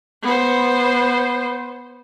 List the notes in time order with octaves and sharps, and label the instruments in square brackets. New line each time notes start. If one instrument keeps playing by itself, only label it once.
[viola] B3 C5